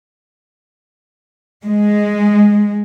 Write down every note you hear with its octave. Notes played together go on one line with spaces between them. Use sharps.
G#3